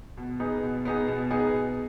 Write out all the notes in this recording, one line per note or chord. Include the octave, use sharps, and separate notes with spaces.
B2
B3 D#4 G#4
B2
B3 D#4 G#4
B2
B3 D#4 G#4
B2